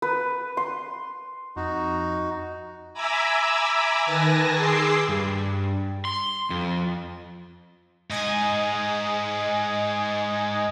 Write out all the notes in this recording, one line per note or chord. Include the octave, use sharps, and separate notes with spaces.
B4
C6
F2 D#4 F#4
E5 G#5 A#5 B5 D6 E6
D#3 B4 G#5 A5 A#6
G#4 C6 D6 E6 C7
G2
C6
F2
G#2 D#5 G#5